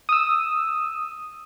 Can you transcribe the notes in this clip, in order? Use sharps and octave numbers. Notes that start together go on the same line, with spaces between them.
D#6 E6